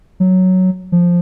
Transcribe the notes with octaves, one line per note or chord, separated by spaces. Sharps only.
F#3
F3